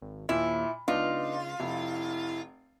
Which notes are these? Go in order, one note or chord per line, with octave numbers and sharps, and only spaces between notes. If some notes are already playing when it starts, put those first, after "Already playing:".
G#1
D#2 A#2 E4
C#2 B3 D4 D#4 F4
F1 E4